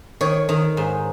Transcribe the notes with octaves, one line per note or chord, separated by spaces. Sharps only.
D#3 C#5
D#3
G#2